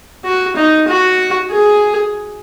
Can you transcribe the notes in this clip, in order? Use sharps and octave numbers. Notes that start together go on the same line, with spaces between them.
F#4
D#4
F#4
G#4